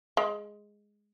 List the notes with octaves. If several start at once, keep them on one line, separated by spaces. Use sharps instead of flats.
G#3